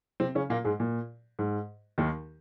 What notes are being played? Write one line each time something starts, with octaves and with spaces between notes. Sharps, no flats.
C3 C4
C#3 C#4
A#2 A#3
G#2 G#3
A#2
G#2
D#2 D#3